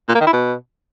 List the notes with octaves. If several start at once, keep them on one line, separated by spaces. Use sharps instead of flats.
A#2
A#3
D#3
E4
B2